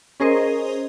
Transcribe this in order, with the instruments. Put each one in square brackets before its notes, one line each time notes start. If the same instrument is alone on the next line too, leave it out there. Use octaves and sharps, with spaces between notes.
[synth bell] C#4 G#4 A#4 C5 D#5